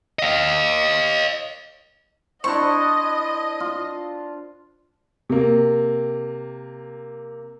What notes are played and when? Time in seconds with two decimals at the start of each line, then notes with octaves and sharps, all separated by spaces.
0.19 D#5 F5
2.44 D4 E4 C5 D#5 C#6 D#6
3.60 F4
5.29 C3 A#3